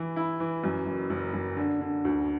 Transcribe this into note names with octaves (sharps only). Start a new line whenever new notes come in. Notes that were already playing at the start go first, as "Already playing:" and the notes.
Already playing: E3 E4
E4
E3
F#2
F#1
F#1
F#1
D3
D3
D2